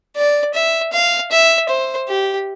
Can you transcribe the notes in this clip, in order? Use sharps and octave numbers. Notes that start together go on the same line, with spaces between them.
D5
E5
F5
E5
C5
G4